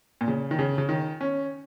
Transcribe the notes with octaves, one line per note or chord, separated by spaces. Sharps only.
A#2
C#3
D#3
C#3
C#3
D#3
C#4